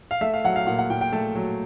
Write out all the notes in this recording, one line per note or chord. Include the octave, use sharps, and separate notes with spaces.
F5
A3 E5
F5
F#3 F#5
F5
A#2 F#5
F#5
A#2 G5
G5
A3 A5
F#3